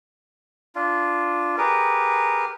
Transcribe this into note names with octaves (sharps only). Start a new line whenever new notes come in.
D4 F4
G4 G#4 A#4 B4